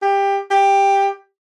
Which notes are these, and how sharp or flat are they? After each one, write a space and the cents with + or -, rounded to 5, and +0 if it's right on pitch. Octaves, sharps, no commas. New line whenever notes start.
G4 +15
G4 +10